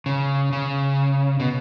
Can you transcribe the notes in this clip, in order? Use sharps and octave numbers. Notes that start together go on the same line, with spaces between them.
C#3
C#3
B2